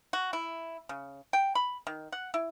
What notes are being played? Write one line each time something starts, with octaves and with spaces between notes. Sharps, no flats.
F#4
E4
C#3
G5
B5
D#3
F#5
E4